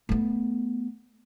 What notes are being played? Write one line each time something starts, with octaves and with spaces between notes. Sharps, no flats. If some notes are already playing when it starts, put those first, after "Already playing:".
A3 B3